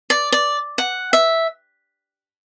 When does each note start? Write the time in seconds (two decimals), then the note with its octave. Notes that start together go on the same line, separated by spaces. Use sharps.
0.10 D5
0.32 D5
0.78 F#5
1.13 E5